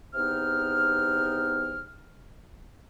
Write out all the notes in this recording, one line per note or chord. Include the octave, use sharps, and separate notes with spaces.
E2 C3 B3 D#4 F6